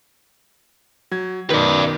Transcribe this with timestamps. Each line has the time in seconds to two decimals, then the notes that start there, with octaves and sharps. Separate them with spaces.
1.11 F#3 G#6
1.50 F#2 B2 D#3 B4 D5